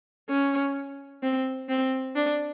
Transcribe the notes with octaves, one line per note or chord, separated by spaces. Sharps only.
C#4
C4
C4
D4